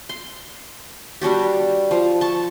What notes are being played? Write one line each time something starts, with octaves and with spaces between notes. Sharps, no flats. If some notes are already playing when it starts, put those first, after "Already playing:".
C6
G3 D4 F#4 G4
F3
A5 C#6